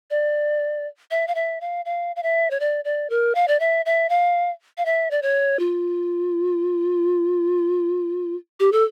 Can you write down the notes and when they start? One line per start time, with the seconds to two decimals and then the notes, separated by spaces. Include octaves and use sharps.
0.10 D5
1.11 E5
1.28 F5
1.35 E5
1.61 F5
1.85 F5
2.16 F5
2.23 E5
2.51 C#5
2.60 D5
2.85 D5
3.10 A#4
3.35 F5
3.48 D5
3.60 E5
3.86 E5
4.09 F5
4.78 F5
4.85 E5
5.11 D5
5.22 C#5
5.59 F4
8.60 G4
8.72 A4